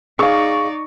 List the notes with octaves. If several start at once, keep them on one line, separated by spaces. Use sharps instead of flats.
D#4 G#4 D5 F5 C#6